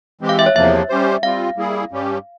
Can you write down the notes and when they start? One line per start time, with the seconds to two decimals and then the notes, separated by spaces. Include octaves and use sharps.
0.21 E3 G#3 C4 G4
0.29 F5
0.39 E5
0.46 C#5
0.55 E2 C3 F3 A#3 E5
0.89 G3 C#4 G4 C5
1.23 G3 C4 F4 F5
1.56 G3 A#3 E4 G#4
1.91 G2 G3 C#4 G4